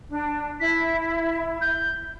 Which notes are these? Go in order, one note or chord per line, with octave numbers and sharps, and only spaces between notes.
D4
E4 B6
G6